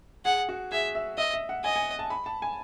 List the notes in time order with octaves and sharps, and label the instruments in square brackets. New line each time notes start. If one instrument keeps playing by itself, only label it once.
[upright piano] G#4 [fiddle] F#5
[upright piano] F#4
[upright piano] G#4 [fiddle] E5
[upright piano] E5
[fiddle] D#5 [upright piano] E5
[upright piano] E5
F#5
[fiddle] D#5 [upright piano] G#5
[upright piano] G#5
A5
B5
A5
G#5